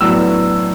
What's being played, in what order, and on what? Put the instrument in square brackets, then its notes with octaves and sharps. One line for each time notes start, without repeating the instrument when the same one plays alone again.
[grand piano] A2 F#3 B3 D4 E6